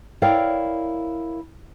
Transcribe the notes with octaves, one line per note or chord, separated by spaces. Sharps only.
E4 A#4 C#5 D5 F5 G5